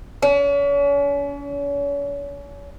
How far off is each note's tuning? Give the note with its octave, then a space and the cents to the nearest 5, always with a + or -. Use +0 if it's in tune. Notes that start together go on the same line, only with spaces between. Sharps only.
C#4 +40